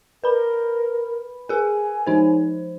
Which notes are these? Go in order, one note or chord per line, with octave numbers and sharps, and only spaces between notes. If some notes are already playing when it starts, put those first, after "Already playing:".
A#4 B4 B5
G#4 A#4 G#5
F3 D#4 C5